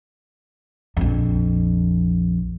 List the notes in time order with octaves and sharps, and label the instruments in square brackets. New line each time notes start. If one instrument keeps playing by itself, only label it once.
[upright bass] A#1 F2